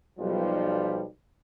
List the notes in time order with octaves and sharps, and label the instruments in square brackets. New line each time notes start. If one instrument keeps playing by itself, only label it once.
[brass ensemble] B1 F3 G3